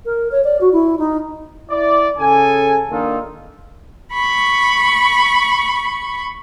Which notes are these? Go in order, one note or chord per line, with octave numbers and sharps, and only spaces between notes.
A#4
C#5
D5
F#4
E4
D#4
E4 D5
C#3 G#4 A4 G#5
D#3 A#3 D4 D#4 F4 A4
B5 C#6